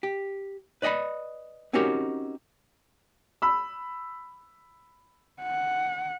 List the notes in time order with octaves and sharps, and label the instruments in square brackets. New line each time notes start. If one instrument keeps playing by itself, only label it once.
[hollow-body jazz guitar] G4
B4 D5 D#5 G5 B5
C4 C#4 D#4 F#4 G4 A#4
[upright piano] B5 E6
[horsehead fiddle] F#5